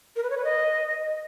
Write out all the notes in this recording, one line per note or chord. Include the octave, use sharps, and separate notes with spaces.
A#4
B4
C#5
B4
D#5